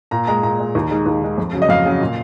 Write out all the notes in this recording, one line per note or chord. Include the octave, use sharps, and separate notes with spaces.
A#2 A#5
G#3 A#5
A#2 A#5
G#3
D#2
D#3 G#3
D#2
D#3 G#3
F2
C#3 F#3
D#5
F2 F5
C#3 F#3
A#2